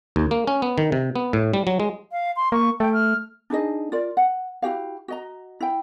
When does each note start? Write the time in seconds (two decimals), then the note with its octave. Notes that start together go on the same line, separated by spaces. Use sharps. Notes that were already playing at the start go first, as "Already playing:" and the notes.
0.16 D#2
0.31 A#3
0.47 C#4
0.62 B3
0.78 D#3
0.92 C3
1.16 B3
1.33 A2
1.54 G3
1.67 F#3
1.80 G#3
2.12 F5
2.36 C6
2.52 A#3 C#6
2.80 A3 G5
2.94 F6
3.50 D4 D#4 G#4 D#5
3.92 F4 A#4 D5
4.17 F#5
4.62 E4 F#4 G4 F5
5.08 F#4 D#5 A#5
5.60 E4 G5